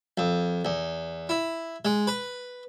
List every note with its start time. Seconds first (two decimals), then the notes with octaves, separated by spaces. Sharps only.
0.18 F2
0.65 E2
1.29 E4
1.85 G#3
2.07 B4